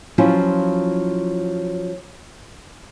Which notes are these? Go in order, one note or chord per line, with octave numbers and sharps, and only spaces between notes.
F3 F#3 C#4 E4 F4